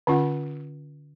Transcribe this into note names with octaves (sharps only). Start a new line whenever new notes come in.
D3 C#4 F4 F#5